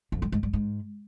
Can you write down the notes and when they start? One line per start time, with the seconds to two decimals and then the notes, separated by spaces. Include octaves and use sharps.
0.12 F2
0.22 G2
0.32 G#2
0.43 G2
0.53 G#2